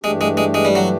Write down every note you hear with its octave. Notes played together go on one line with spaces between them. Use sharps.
G2 E3 G#3 A3 D4 G4
G#3
G#3
G#3
G3
F#3